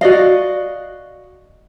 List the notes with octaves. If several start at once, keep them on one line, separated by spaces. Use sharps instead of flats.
F#4 D5 D#5 F5